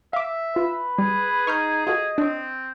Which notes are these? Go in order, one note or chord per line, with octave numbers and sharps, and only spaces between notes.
E5 F5 D6
F4 B4
G3 G#4
D#4 C#6 F6 G6
F4 F#4 A4 D#5
C4 D4 C#5